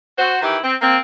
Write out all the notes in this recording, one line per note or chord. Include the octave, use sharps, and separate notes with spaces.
F#4 C5
D#3 E3 E4 G4
C4
A#3 C4